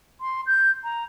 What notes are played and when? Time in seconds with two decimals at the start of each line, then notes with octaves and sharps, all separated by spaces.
0.21 C6
0.47 G6
0.84 A#5